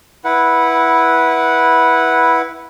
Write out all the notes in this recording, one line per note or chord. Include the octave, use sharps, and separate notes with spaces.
E4 B4 F#5